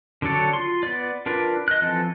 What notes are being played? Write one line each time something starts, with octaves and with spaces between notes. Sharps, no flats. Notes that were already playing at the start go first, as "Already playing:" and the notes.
D3 F#3 D4 A4 C#5
F4 C6
B3 D5
D4 F4 A#4 B4 D5
D#5 F#6
E3 F3 C4 A4